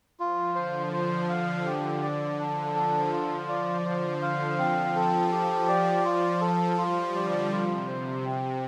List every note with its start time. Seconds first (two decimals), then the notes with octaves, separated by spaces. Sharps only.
0.20 F3 F4
0.55 D3 C5
0.93 D3 C5
1.29 D3 F5
1.66 G4
2.02 D5
2.38 F3 D4
2.75 A4
3.12 F4
3.49 D5
3.85 D3 C5
4.22 F5
4.58 F3 C4
4.95 F3 A4
5.32 G4
5.68 D5
6.05 F4
6.41 A4
6.78 G3 F4
7.14 D3 D5
7.51 C3 F4
7.88 C5
8.24 C3 C4